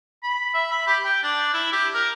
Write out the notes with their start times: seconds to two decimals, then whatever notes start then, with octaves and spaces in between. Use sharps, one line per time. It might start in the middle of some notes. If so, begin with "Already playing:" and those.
0.23 B5
0.54 E5
0.71 B5
0.87 G4
1.04 G5
1.23 D4
1.53 E4
1.72 G4
1.94 A#4